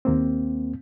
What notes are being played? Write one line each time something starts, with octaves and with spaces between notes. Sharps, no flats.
D#2 A#3 C4